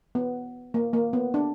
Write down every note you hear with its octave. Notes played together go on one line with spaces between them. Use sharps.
B3
A#3
A#3
B3
D4